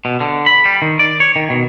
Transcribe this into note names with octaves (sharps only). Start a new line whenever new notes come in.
B2
D3
B5
G3
D#3
D5
C#5
D#3
B2